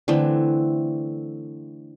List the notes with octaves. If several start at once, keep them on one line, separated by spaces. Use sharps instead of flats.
D3 E3 A3 C4